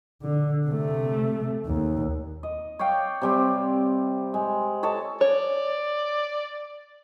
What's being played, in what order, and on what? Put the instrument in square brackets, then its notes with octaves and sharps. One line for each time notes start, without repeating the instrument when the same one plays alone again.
[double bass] D3
C3 A3
D#2
[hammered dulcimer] D#5
C#5 D5 F5 G5
C3 G3 C4
G#3
A4 C#5 D#5 A5
[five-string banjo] C#5 [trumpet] D5